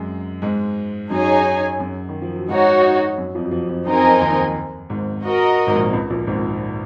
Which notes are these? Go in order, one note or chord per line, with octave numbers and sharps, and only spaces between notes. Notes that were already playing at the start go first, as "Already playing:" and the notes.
Already playing: F#2 F#3 G#3
G#2 G#3
F#2 F#3 D#4 G#4 C#5 G#5
F#2 F#3
D#3
F3
F#3
G#2 G#3 D#4 F#4 C#5
F#2 F#3
F2 F3
F#3
F2 F3
F2 F3
F#2 F#3 C4 D#4 A#4 D#5 G#5
F2 F3
D#2 D#3
G#1 G#2
F#4 A#4 D#5
G#1 G#2
A#1 A#2
C#2 C#3
A#1 A#2
G#1 G#2